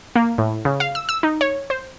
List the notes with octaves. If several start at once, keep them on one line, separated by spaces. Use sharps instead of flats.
A#3
A2
C#3
F5
E6
E6
D#4
C#5
C5